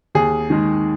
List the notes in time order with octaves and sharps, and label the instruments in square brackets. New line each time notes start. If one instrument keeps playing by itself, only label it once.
[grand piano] D#2 G#4
D#3 G#3